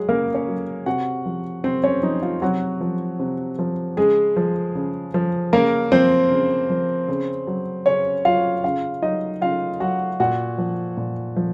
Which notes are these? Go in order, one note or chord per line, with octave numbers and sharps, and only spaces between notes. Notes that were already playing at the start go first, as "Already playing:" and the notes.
Already playing: F#3 G#3 G#4
C#3 A#3 A#4
C#4 C#5
F#3
C3 F#4 F#5
F3
C3 C4 C5
C#4 C#5
F3 D#4
F4
C3 F#3 F#4
F3
C3
F3
C#3 G#3 G#4
F3
C#3
F3
C#3 A#3 A#4
F3 C4 C5
C#3
F3
C#3
F#3
C#3 C#4 C#5
F#3 F4 F5
C#3 F4 F5
F#3 D#4 D#5
C#3 F4 F5
F#3 F#4 F#5
A#2 F#4 F#5
F3
A#2
F3